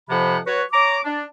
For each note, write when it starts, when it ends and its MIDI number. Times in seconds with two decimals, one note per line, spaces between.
0.09 0.38 41
0.09 0.38 48
0.09 0.38 53
0.09 0.38 78
0.09 0.38 83
0.47 0.62 54
0.47 0.62 66
0.47 0.62 71
0.47 0.62 73
0.71 0.99 73
0.71 0.99 82
0.71 0.99 86
1.04 1.22 62